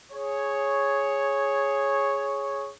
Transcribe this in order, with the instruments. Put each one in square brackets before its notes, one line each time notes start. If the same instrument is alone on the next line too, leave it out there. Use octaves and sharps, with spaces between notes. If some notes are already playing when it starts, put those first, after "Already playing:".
[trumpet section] G#4 C#5